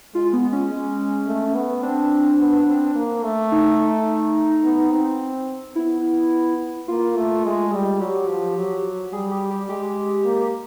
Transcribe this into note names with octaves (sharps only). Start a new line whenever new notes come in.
G#3 F4
B3
C#4
G#3
A3
B3
C4 D4
B3
C4
A#3
A3
D#4
B3
C4
B3 E4
A#3 F4
A3
G#3
G3
F#3 G4
F3
F#3
G3 G#4
G4
G4
G#3 G4
A#3